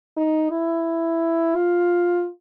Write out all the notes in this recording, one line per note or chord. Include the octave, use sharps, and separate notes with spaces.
D#4
E4
F4